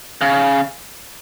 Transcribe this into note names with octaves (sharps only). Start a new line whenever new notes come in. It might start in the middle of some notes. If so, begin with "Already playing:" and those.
C#3